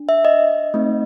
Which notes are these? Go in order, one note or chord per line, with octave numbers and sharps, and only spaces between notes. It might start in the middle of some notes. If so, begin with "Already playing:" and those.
Already playing: D4
E5
D#5
A3 C4 D#4